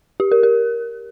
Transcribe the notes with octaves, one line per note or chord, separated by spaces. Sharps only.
G4
A#4
A#4